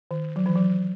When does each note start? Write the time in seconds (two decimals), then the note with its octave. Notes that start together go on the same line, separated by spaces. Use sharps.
0.11 D#3
0.36 F#3
0.46 E3
0.56 F#3